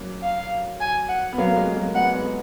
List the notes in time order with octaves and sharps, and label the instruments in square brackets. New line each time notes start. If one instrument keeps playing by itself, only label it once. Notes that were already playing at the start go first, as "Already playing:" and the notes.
Already playing: [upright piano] F#3 A#3 C#4
[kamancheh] F5
G#5
F#5
[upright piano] B3
[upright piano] F#3 A#3 [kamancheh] F5
[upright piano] A#3
G#3
F#3 A#3
[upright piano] G#3 B3 [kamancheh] F#5
[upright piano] G#3 B3